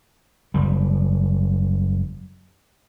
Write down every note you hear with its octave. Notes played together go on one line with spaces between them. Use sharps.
F#1 G3